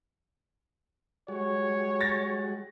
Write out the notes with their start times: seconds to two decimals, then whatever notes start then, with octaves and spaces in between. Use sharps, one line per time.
1.28 G3 G#3 F#4 C#5
2.01 A6 A#6